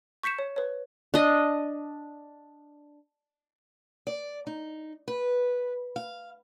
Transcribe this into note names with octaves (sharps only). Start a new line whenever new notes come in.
C#6 G6 B6 C#7 E7
C#5
B4 C#5
D4 D#5
D5
D#4
B4
F5